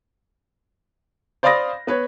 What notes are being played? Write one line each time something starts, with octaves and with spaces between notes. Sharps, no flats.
C5 D5 F5 B5 D#6 A#6
B3 B4 C#5